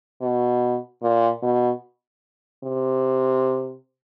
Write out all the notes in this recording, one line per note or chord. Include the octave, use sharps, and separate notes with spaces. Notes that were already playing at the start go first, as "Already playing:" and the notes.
B2
A#2
B2
C3